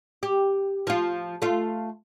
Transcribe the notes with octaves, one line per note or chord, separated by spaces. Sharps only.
G4
F3 F4
A3 F4